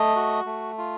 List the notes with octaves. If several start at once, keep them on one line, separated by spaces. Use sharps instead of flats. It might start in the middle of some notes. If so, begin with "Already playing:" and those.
Already playing: A3 D#5
F#4
A3
F4